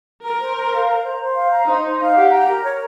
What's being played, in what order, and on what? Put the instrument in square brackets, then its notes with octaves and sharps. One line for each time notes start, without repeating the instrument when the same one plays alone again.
[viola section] A#4 [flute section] A#5
[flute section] C5
C5
F5
A#5
C5
C5
F5
A#5
[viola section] D#4 [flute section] C5
[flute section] C5
F5
[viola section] G4 [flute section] F#5
[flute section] A#5
A#4
C#5